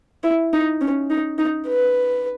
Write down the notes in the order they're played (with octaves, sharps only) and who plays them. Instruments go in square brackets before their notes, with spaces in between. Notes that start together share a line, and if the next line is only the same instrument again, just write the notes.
[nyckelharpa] E4
D#4
C#4
D#4
D#4
B4